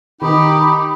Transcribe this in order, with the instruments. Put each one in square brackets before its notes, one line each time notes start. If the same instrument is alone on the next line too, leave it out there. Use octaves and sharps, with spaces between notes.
[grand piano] D#3 [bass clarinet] D#4 [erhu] G4 [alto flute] B5